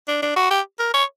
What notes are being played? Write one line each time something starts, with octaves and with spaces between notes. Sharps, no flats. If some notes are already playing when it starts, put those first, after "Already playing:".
D4
D4
F#4
G4
A#4
C#5